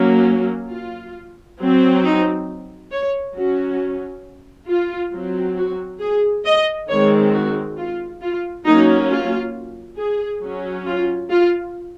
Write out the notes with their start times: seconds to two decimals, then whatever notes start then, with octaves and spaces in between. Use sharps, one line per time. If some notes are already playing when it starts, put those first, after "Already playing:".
Already playing: F#3 A#3 C#4
0.71 F4
1.60 F#3 C4
2.04 D#4
2.92 C#5
3.36 F#3 C#4 F#4
4.69 F4
5.12 F#3 C4
5.57 F#4
6.01 G#4
6.45 D#5
6.89 D#3 G#3 C4 C#5
7.33 F#4
7.78 F4
8.22 F4
8.65 F#3 A#3 C#4 D#4
9.10 F4
9.98 G#4
10.42 F#3 C#4
10.86 F4
11.30 F4